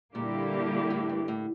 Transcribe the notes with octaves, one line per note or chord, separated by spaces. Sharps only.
A#2 D3 G3 A#3 E4 G4
A2
G2
A2